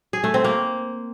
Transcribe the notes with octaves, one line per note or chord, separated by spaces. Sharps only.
G#4
A3
C4
A#3